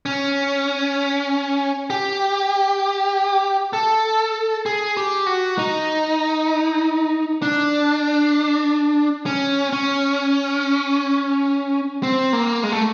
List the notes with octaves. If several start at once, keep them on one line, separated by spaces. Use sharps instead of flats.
C#4
G4
A4
G#4
G4
F#4
D#4
D4
C#4
C#4
C4
A#3
G#3
A3